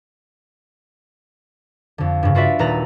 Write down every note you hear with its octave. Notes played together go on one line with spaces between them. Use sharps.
F2 D3
G2 C#3
F4 F#4 B4 D5 E5
D#1 A4 B4 A#5 A#6